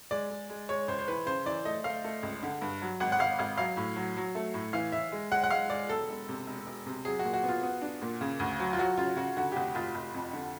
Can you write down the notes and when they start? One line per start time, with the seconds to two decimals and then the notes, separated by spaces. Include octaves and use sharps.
0.11 G#3 D5
0.30 G#3
0.49 G#3
0.69 G#3 C#5
0.88 C#2 C5
0.99 C5
1.08 E3 B4
1.26 C#3 C5
1.45 E3 D5
1.65 A3 D#5
1.84 A3 F5
2.04 A3
2.23 C#2
2.43 D3
2.61 G2
2.82 F#3
3.00 G#1 F#5
3.12 F#5
3.19 G#1 F5
3.39 G#1 F5
3.58 F#3 F5
3.77 A2
3.96 F#3
4.17 F#3
4.35 A3
4.54 A2
4.73 E3 F5
4.92 E3 E5
5.12 G#3
5.31 G#3 F#5
5.43 F#5
5.51 G#3 F5
5.70 G#3 D5
5.89 E1 A4
6.09 E1
6.28 C3
6.47 E1
6.66 E1
6.86 C3
7.05 F#3 G#4
7.19 A#2 F#4
7.34 F#4
7.43 B3
7.49 F4
7.63 B3
7.82 D4
8.02 A#2
8.21 C#3
8.40 D2
8.59 F#3
8.73 F4
8.78 F#3 F#4
8.97 C#3 F4
9.16 C#3 F#4
9.37 D3 F#4
9.52 G4
9.56 F1 F#4
9.75 F1 F4
9.94 F1
10.14 F2
10.33 D3